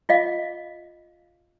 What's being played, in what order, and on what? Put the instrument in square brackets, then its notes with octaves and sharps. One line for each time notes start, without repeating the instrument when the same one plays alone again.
[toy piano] F4 D#5 F5